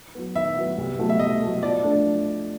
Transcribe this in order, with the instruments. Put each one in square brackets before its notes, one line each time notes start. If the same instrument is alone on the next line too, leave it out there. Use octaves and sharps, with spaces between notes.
[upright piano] F#3 B3
[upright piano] D#3 [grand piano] E5
[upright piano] F#3 B3
C2
B2 F#3 A3
[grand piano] E5
[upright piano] C2 [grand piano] D#5
[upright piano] B2 F#3 A3
[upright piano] F3 [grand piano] D5
[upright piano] A3 D4
F3